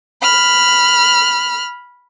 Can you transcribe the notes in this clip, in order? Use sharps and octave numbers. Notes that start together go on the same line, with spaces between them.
B5 F6